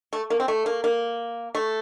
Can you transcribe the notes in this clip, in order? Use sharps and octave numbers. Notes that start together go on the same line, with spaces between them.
A3
A#3
C4
A3
A#3
A#3
A3